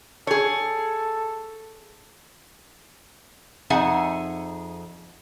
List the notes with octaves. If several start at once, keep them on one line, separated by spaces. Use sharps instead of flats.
G#4 A4 C#5
F2 D#4 G#4 E5 F#5 G#5